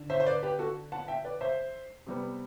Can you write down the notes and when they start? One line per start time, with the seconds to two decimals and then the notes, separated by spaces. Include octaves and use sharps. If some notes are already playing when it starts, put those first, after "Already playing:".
Already playing: D3
0.10 C5 E5
0.20 C5
0.26 B4 D5
0.43 G4 B4
0.59 F#4 A4
0.92 F#5 A5
1.08 E5 G5
1.24 B4 D5
1.41 C5 E5
2.06 C3 G3 B3